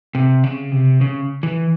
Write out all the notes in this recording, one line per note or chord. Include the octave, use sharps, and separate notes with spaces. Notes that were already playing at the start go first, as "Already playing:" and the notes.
C3
C#3
C3
C#3
E3